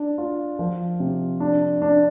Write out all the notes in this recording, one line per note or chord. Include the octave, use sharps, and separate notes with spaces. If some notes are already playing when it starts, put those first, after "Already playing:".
Already playing: D4
F4
F3
C3
D4
D4